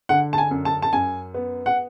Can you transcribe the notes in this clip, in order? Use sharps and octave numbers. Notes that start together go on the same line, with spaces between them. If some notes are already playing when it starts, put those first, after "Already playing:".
D3 F#5
A5
G#5
F#2
A5
A5
F#2 G#5
B3
F#5